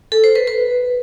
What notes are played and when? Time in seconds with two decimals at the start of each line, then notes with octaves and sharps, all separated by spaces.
0.12 A4
0.24 C5
0.36 B4
0.47 B4